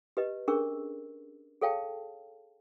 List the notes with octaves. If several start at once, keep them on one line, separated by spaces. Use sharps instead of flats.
G4 B4 D#5
C#4 D4 G#4 A#4 C#6 E6
G#4 A4 C#5 F5 G5 A5